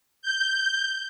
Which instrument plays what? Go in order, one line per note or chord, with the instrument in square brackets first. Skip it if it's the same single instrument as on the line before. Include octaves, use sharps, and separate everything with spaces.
[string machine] G6